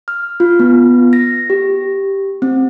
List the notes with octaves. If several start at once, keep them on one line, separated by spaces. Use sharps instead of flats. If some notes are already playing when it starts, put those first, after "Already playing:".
F6
F4
B3
A#6
G4
C4